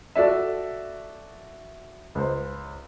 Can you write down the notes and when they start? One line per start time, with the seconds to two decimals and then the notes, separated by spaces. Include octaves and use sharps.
0.16 F#4 A4 D5 E5
2.15 C#2 C5